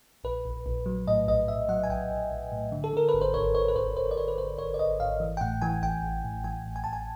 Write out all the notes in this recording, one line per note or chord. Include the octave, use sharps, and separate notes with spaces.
A#1 B4
A#1
A#1
F#3
A2 D#5
A#1 D#5
A2 E5
F#3 F#5
G#5
A#1 G5
A#1
A#1
A2
D3
A4
D3 A#4
B4
G#1
C5
G#1 C#5
G#1 C#5
B4
G#1 C5
G#1 C5
D5
G#1 C#5
B4
G#1 C5
G#1 C#5
D5
G#1 D#5
G#1 F5
E3
G5
A2 F#5
E3 G#5
A1 G5
A1
A2
E3 G#5
A2
G#5
A1 A5
G#5